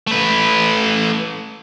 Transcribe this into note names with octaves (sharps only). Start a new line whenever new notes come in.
A3 B4